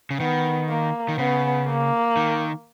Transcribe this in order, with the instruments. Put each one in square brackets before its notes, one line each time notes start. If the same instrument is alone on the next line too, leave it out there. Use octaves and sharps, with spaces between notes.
[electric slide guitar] C#3
[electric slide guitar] D#3 [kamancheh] B3
[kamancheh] A#3
[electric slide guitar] D#3
[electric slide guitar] C#3 [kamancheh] B3
[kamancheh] A#3
[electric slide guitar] D#3